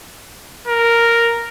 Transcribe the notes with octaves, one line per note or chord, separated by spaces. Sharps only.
A#4